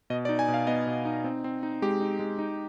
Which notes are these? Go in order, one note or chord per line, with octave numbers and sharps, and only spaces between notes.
B2 D#5
D5
D#4
G#5
B2
F5
B3 D#5
B2
D#4
C4
C4
D#4
G#3 G4
D#4
G#3
D#4